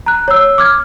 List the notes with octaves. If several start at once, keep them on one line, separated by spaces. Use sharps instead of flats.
A#5 F#6
C#5 E6
D6 F6 G#6